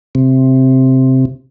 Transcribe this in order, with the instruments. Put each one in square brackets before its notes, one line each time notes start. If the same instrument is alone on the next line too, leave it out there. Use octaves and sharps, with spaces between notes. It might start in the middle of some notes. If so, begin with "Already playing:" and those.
[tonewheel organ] C3